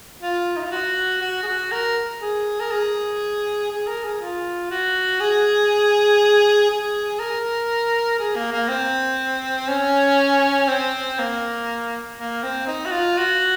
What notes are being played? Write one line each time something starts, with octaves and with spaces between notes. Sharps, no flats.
F4
D#4
F4
F#4
F#4
G#4
F#4
A#4
G#4
A#4
G#4
G#4
A#4
G#4
F4
F#4
G#4
G#4
A#4
G#4
A#3
A#3
C4
C#4
C4
A#3
A#3
C4
D#4
F#4
F4
F#4